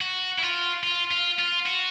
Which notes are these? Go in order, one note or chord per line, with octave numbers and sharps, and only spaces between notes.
F#4
E4
F4
F4
F4
F4
F#4